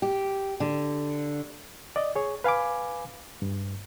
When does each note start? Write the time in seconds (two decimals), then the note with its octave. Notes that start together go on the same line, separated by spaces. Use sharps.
0.02 G4
0.60 D3
1.96 D5 D#5
2.15 G#4 C#5
2.44 B4 F5 G#5 B5 D6
3.42 G2